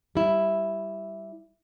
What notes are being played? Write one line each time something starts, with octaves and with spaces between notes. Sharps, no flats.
G3 E4